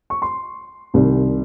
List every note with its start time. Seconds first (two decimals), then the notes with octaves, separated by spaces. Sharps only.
0.10 C#6
0.22 C6
0.94 C2 C3 D#3